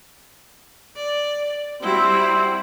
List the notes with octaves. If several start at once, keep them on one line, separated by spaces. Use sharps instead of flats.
D5
G3 C4 E4 F#4